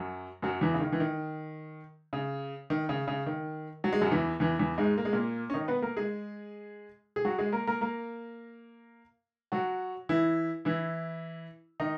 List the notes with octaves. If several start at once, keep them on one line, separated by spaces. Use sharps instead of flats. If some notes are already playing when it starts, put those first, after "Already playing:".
Already playing: F#2 F#3
F#2 F#3
E2 E3
C#3
D#3
E3
D#3
C#3
D#3
C#3
C#3
D#3
F#3
G#3
F#2 F#3
E2 E3
E2 E3
E2 E3
G#2 G#3
A#3
G#3
A#2 A#3
C#4
D#3 D#4
B3 B4
A#3 A#4
G#3 G#4
G#4
F#3 F#4
G#3 G#4
A#3 A#4
A#3 A#4
A#3 A#4
F#3 F#4
E3 E4
E3 E4
D#3 D#4